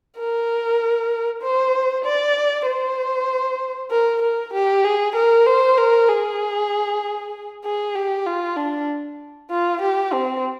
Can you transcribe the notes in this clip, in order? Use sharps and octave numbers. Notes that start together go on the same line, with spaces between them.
A#4
C5
D5
C5
A#4
A#4
G4
G#4
A#4
C5
A#4
G#4
G#4
G4
F4
D4
F4
G4
C4